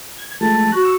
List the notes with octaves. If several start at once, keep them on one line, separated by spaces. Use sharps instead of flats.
G#6
F3 G#3 A3 A5
F#4 A#5 F#6
C#6 E6